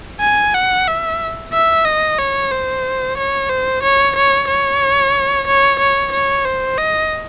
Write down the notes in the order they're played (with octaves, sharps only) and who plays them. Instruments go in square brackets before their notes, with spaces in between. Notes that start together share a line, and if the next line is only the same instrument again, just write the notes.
[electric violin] G#5
F#5
E5
E5
D#5
C#5
C5
C#5
C5
C#5
C#5
C#5
C#5
C#5
C#5
C5
D#5